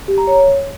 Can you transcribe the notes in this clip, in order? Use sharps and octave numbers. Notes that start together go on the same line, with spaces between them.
G4
A#5
C#5